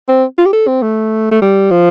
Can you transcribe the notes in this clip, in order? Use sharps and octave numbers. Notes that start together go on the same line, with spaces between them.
C4
F4
G4
A4
C4
A3
A3
G3
F3